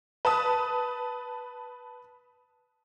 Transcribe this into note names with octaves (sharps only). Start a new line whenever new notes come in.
B4 A5 D#6